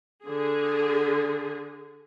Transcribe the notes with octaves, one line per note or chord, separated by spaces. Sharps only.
D3 G#4